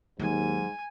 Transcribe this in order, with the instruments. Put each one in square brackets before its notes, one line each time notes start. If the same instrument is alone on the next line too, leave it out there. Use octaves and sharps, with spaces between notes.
[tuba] D#2 [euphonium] G#2 [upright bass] F#3 [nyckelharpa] G#5